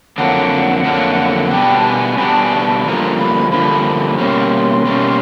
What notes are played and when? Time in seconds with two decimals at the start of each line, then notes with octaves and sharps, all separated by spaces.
0.18 F2 D3 F#3 A#3 D4 F#5
0.84 F2 D3 F#3 A#3 D4
1.46 F#5
1.51 B2 G3 B3 D4 G5
1.77 A5
1.85 G#5
2.18 B2 G3 B3 D4 A#5
2.28 A5
2.39 G#5
2.49 A5
2.84 G2 D3 F3 A#3 A#5
3.17 B5
3.51 G2 D3 F3 A#3 B5
4.18 B2 G3 A#3 C#4 C6
4.84 B2 G3 A#3 C#4